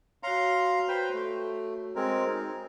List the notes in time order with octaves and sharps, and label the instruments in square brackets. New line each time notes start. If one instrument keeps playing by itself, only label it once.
[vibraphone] F#4 C#5 [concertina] F5 A#5 C6
[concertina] B4 C5 G5
A3
G#3 C4 A#4
D#4